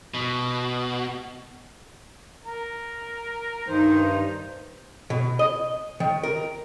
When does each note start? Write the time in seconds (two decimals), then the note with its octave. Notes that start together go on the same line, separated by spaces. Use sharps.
0.14 B2
2.46 A#4
3.67 G2 D#3 D#4 C5
5.10 B2
5.39 D#5
6.00 D#3
6.23 A#4